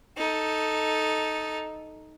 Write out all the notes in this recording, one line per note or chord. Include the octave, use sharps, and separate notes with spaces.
D#4 A4